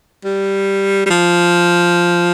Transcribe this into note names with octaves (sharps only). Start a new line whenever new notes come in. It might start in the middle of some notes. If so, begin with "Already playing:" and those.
G3
G3
F3